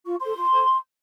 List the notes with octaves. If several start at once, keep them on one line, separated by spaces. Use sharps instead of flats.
F4 C#6
A4 C5 C6
F4
A4 C5